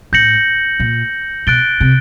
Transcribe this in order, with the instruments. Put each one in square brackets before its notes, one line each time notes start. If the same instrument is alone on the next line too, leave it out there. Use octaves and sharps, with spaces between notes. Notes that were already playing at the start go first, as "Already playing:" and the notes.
[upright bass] A2 [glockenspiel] G6 A#6 C#7 F#7
[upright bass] A#2
[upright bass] B2 [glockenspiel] F#6 A6 D7 G7
[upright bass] C3